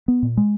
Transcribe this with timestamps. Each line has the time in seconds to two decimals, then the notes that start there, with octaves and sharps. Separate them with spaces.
0.08 B3
0.23 A#2
0.37 G#3